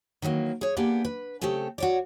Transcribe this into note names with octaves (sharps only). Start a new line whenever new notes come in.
D#3 E3 F#3 A#3
G#4 C#5
A#3 B3 D4 G4 G#4
B4
C#3 A3 C4 G4 A4
F#4 C#5 D5